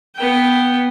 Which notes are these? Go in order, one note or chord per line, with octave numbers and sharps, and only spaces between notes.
B3 G5